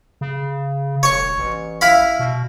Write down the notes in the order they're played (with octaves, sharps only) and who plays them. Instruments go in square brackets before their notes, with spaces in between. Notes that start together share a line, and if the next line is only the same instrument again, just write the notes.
[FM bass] C#3
[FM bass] E1 [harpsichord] C#5 C#6
[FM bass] A1
[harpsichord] E4 F5 B5
[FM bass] B2